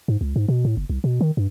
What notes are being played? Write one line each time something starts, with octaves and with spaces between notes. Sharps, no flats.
G#2
C#2
G#2
B2
A2
F#1
C2
B2
D#3
G2